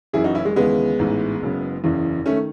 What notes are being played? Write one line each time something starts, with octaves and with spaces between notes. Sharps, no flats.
F#1 F#2 C#3 E3 E4 G#4
D#4 F#4
C#4 E4
G#3
D#2 C#3 E3 G#3 B3
A1 G#2 E3
F#1 F#2 C#3
F#1 E2 C#3 E3
D#3 A3 C#4